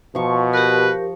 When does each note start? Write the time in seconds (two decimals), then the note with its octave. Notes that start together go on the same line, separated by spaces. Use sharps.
0.15 B2 F3 C#6
0.54 G4 A#4 B4